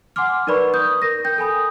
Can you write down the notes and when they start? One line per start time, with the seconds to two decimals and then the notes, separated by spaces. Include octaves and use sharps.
0.16 F#5 G#5 C6 D6 F6
0.47 D#4 A#4 B4 D5 B5 C#6
0.74 D#6 G6
1.02 A#4 A#6
1.24 G5 G6
1.38 A4 G#5 B5 D#6